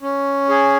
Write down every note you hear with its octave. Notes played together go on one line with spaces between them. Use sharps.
C#4
G#4